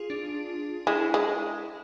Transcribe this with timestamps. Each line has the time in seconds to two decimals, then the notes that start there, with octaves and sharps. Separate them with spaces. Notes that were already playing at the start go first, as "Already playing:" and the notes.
Already playing: F4 G#4
0.10 D4
0.87 G#3 E4
1.14 G#3